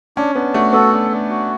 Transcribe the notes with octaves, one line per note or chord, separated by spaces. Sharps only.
C#4 D4
B3 D4
A3 F#4
B3 A4
D4
D4
F#4